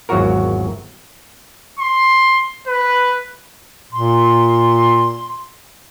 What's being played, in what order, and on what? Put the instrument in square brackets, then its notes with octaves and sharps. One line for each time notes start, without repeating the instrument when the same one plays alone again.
[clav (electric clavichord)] G#1 E2 F#3 F4 F#4 A#4
[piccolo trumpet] C6
B4
[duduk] A#2 [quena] C6